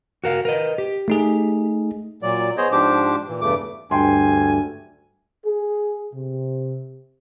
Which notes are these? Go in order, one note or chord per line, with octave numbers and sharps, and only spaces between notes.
F#4 A#4 F5
A#4 B4 D#5
G4
A3 D#4 G#4
A#2 F#3 D5
B3 G#4 C5 C#5 D#5
G#2 F3 D4 G4 C5 D6
A#2 E3
E2 G2 C#3 A3 D6
D2 G2 G5 G#5 C6
G#4
C3